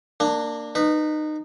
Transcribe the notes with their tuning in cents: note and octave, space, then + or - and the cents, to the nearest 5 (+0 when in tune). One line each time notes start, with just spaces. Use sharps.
A#3 -15 D4 +10
D#4 -25 B4 +0